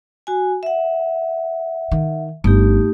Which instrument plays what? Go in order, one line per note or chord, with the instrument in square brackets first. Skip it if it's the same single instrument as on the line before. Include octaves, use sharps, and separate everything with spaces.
[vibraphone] F#4 G#5
E5 F#5
[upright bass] D#3
[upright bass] G1 [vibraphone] A3 D#4 G4